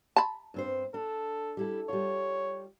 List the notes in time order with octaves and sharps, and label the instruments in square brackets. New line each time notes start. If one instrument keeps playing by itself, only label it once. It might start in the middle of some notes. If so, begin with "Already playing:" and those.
[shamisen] A5 B5
[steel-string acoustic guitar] G2 C4 C5
[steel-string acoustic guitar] D4 [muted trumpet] A4
[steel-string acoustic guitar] G3 E4 A4
[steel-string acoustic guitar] G3 F4 [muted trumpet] C#5